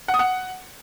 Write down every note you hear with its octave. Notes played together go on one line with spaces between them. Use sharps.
F#5
D#6
F#5